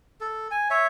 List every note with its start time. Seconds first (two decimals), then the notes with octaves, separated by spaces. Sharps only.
0.21 A4
0.51 G#5
0.70 C#5 E5